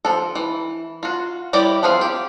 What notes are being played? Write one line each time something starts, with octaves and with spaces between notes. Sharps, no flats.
F3 A4
E3
F4 F#4
G3 E4 G4 C#5 D5
F3 B3 C4 G#4 F5
G4